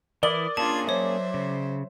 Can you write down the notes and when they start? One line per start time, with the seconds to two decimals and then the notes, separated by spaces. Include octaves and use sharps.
0.23 E3 E4 A#4 D5 D#6 F#7
0.57 A#3 C#4 D4 F4 G#4 A5 G#6
0.89 F#3 C5 C#5 E5
1.34 C#3